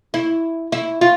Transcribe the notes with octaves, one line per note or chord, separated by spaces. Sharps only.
E4
E4
F4